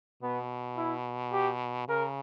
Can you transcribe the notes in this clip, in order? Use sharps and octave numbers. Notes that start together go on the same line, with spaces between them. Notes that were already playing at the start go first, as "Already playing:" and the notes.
B2 B3
E4
G4
C#3 A#4